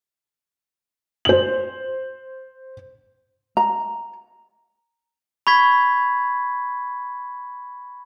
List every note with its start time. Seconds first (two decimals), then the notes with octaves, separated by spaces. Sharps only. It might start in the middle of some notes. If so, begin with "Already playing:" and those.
1.25 C5 F#7
3.57 A#5
5.47 B5 C#6 G#6 B6